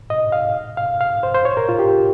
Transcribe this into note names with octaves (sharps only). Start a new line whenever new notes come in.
D#5
F5
F5
F5
C5
C5
C#5
A#4
F4
G4